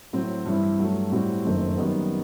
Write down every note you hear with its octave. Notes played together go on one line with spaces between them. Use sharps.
A2 F#3 C4
G2 E3 G3 C4 E4
G2 F#3 A3
A2 G3 C4 F#4
F#1 F#2 D#3 A3 C4
F#2 D#3 G3 B3